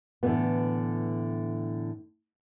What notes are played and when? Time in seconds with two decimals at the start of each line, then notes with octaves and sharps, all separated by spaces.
0.23 A2 D3 E3 F3 A3 B3